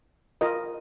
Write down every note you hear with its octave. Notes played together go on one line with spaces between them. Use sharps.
F4 A#4 D#5